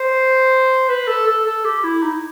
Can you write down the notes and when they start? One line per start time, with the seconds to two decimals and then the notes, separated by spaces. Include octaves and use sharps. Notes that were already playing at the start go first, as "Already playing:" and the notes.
Already playing: C5
0.89 B4
1.08 A4
1.27 A4
1.46 A4
1.65 G4
1.84 E4
2.03 D#4